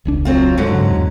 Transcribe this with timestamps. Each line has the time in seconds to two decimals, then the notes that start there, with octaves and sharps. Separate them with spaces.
0.05 E1 C#2 D4
0.25 F#3 C4 F4
0.57 G#2 D3 F#3
0.72 G2 C#3
0.90 E2